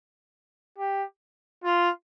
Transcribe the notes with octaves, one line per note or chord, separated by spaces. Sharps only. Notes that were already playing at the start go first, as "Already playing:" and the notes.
G4
F4